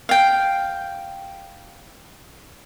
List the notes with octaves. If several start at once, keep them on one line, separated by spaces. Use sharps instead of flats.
F5 G5